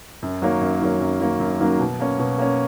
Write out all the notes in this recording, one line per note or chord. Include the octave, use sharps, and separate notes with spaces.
F#2
D#3 F#3 A#3 C#4
F#2
D#3 F#3 A#3 C#4
F#2
D#3 F#3 A#3 C#4
F#2
D#3 F#3 A#3 C#4
B2
A#3 C#4
B2
A#3 C#4